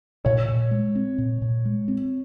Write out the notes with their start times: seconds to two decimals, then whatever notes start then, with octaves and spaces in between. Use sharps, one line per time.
0.25 A#2 C#5
0.48 A#2
0.71 G#3
0.95 C4
1.18 A#2
1.42 A#2
1.65 G#3
1.88 C4